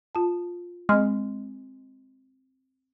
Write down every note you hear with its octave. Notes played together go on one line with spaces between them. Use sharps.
F4 A5
G#3 C4 F6